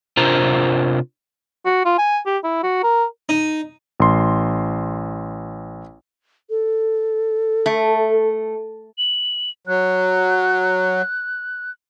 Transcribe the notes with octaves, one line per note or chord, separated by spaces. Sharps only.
C3 D4 F4 A#4 C5 A#5
F#4
F4
G#5
G4
E4
F#4
A#4
D#4
A1 C6
A4
A3
F#7
F#3 F#6